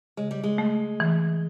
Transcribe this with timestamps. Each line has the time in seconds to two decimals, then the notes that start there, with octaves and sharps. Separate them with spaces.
0.17 C#3 G#3
0.31 G3
0.44 G#3
0.58 A3
1.00 E3